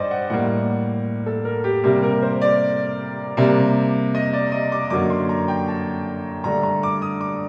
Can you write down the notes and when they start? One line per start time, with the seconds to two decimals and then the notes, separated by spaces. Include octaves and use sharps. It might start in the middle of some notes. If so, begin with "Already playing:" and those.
Already playing: G2 C5 D5 D#5
0.11 F#5
0.30 A2 G3 A#3 F#5
1.26 A4
1.45 A#4
1.64 G4
1.84 C3 G3 A#3 G4
2.03 A#4
2.23 C5
2.42 D5
3.37 C3 G3 A#3
4.15 D#5
4.33 D5
4.52 D#5
4.72 D6
4.90 F#2 D3 F#3 A#3 D6
5.10 C6
5.29 A#5
5.48 G5
5.68 A5
6.44 G2 D3 A3 A#5
6.63 A#5
6.83 D6
7.02 D#6
7.21 D6